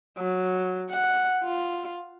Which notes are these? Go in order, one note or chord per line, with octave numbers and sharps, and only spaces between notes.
F#3
F#5
F4